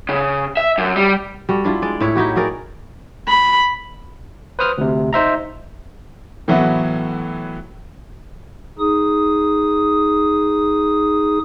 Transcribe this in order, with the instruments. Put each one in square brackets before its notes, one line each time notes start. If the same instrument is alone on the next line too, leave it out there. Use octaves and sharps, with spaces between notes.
[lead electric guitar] C#3
E5
F#2
G3
[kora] G3 F#4 A4
D4 E4 F4
G#3 D5
A2 E4 C#5
D#4 E4 F#4 G4
F#4 G#4 A#4 D5
[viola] B5
[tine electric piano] B4 C5 D#6 F6
D2 C3
D#4 C5 E5 A#5
[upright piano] A2 E3 F#3 A3 B3
[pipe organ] D#4 G#4 D#6